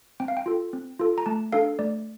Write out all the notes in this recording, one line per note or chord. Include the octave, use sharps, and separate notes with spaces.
C4 G5
F5
G5
F4 A4
C4
F4 A4
A#5
A3 A5
D4 A4 F5
A3 D5